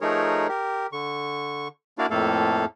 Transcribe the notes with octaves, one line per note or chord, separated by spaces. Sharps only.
F3 A3 D#4 G#4 A#4 C#5
G4 A#4
D3 C#6
A#3 D4 E4 F#4 D5 F5
F2 A2 A3 A#3 A4 F5